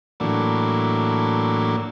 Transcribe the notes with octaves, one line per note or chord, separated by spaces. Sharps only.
A2 E3 F#3 A#3 D4